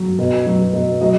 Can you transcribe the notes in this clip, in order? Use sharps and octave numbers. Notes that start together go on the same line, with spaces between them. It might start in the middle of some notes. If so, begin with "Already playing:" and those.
Already playing: F#3
B2
F#3
B2
F#3 D#5